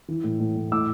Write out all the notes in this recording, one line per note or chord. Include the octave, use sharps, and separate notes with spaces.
E3
A2
A2
A2
A2 D6 E6